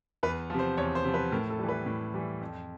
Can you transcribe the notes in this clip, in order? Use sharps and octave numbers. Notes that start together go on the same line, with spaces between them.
E2 B4
C3 F3
C5
E2 C#5
C5
C3 F3
B4
A2 A#4
A4
E3 G3
B4
A2
E3 G3
F2